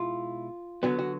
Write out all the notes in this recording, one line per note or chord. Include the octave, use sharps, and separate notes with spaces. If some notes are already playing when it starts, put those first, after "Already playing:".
Already playing: B2 G#3 E4 F4
D3 F#3 B3 F#4
F#4